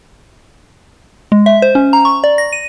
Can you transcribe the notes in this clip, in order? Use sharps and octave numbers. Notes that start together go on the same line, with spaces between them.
G#3
E5
C5
C#4
A#5
C#6
D5
A#6
D#7